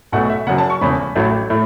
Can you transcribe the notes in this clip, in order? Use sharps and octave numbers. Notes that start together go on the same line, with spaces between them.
B1 B2 A3 F#5
E5
F#1 F#2 F#3 F#5
A5
C#6
E1 E2 C#3 B5
A1 A2 F#3 A3
A2 A3